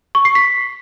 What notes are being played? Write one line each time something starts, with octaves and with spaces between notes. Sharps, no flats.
C#6
C7
B6